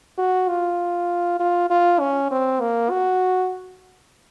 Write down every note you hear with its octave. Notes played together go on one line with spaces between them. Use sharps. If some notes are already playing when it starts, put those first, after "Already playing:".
F#4
F4
F4
F4
C#4
C4
A#3
F#4